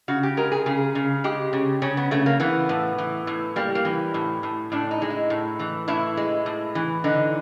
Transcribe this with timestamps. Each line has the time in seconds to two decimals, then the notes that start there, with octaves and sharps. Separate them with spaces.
0.08 C#3 F#4
0.23 G4
0.37 G#3 A#4
0.52 G#4
0.66 C#3 G#4
0.95 C#3
1.24 G#3 G4
1.53 C#3
1.82 C#3 C#4
1.97 B3
2.11 C#3 A3
2.26 A#3
2.40 E3 B3
2.69 A2
2.98 E3
3.27 A2
3.56 G3 A#3
3.75 A#3
3.85 E3
4.14 A2
4.43 A2
4.72 A2 D4
4.91 D#4
5.02 G#3
5.10 E4
5.30 A2
5.59 E3
5.88 A2 E4
6.17 G#3
6.46 A2
6.75 E3
7.04 D3 D#4